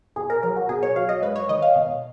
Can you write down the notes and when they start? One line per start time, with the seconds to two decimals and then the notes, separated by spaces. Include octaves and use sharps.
0.16 B2 G#4
0.30 A#4
0.43 F#3 A#4
0.56 F#4
0.69 B2 G#4
0.83 C#5
0.96 F#3 F5
1.09 D#5
1.22 G#2 B4
1.36 C#5
1.49 D#3 D#5
1.62 F5
1.75 B2